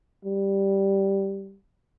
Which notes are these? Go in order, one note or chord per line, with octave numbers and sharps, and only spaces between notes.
G3